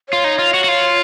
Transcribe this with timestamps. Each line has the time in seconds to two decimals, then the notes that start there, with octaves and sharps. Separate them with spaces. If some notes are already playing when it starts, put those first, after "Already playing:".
0.09 F4 C#5
0.24 D#4
0.39 F4
0.54 F#4
0.64 F#4
0.68 F4